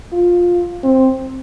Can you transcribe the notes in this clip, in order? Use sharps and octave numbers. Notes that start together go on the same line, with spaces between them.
F4
C4